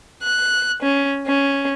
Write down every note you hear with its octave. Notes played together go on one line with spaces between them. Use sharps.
F#6
C#4
C#4